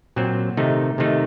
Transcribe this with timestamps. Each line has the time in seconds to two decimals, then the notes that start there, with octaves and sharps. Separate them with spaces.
0.16 A#2 F#3 C4
0.57 C3 D#3 A3 D#4
0.98 C3 D#3 A3 D#4